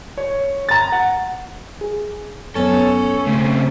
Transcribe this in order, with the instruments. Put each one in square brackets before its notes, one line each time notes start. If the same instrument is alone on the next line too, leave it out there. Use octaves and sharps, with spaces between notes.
[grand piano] C#5
A#5 A6
F#5
[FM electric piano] G#4
[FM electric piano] F#2 B3 C#5 [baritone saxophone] C#4 [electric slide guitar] A4
[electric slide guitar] C#3 C4 [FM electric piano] A3